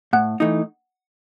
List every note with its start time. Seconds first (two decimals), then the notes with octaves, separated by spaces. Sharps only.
0.13 A2 F#5
0.40 E3 A3 D#4